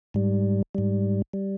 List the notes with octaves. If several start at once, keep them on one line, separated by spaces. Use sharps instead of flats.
G#2 G3
G#2 G3
G3